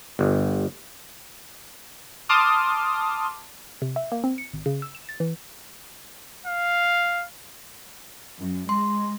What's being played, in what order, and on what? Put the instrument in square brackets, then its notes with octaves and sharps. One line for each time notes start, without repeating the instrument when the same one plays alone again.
[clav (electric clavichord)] G1
[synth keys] A5 C6 D6 D#6 F6
[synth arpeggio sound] C3
E5
A#3
C4
C#7
G#1
C#3
E6
E7
A6
E3
[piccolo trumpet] F5
[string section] F#2
[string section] G#3 [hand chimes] C6